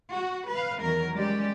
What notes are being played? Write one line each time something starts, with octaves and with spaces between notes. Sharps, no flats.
F#4
B4 F5
E2 D#3 F#3 A#4
G3 G#3 C#4 G4 D5